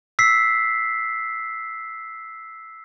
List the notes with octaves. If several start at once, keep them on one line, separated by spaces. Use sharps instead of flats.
E6 B6 C7